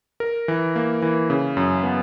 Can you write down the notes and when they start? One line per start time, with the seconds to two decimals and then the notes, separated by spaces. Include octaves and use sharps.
0.20 A#4
0.48 E3
0.76 A#3
1.02 E3
1.30 C#3
1.57 F#2
1.83 B3